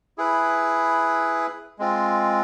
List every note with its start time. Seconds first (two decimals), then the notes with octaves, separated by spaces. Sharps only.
0.18 E4 G#4 B4
1.79 G#3 C4 F4